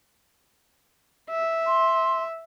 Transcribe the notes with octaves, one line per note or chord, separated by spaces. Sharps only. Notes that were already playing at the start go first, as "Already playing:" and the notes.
E5
C6